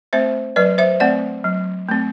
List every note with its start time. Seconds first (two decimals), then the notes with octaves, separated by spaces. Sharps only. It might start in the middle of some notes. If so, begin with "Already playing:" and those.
0.13 A3 C4 C5 E5
0.56 F#3 B4 D5
0.78 C5 E5
1.00 A3 C4 D5 F#5
1.44 F#3
1.89 A3 C4